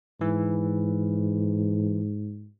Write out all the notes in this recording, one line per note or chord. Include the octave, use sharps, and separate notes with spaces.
G#2 E3